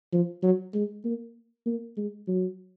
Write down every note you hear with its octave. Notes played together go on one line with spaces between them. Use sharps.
F3
F#3
G#3
A#3
A#3
G#3
F#3